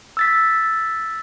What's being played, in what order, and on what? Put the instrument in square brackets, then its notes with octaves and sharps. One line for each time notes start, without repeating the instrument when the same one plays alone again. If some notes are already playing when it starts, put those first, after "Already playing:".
[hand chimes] E6 A6 B6